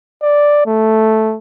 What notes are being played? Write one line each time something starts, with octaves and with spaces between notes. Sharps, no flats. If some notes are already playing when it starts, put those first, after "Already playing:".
D5
A3